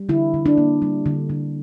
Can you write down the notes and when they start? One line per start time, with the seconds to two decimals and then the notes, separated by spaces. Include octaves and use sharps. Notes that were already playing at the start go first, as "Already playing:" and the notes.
Already playing: G3
0.09 D3 E4
0.34 D3
0.46 D4
0.58 A#3
0.82 G3
1.06 D3
1.30 D3